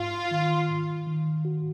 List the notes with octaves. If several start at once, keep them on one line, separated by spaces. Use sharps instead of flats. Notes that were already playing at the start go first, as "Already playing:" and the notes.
Already playing: G#2 F4
D#3
G#2
D#3
F#4